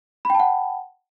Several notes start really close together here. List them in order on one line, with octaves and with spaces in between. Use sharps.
B5 G5 A5 F#5